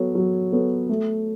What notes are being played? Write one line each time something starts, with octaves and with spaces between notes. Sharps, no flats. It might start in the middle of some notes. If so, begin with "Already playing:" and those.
Already playing: F#3 B3 A4 C#5
F#3
B3 A4 C#5
A3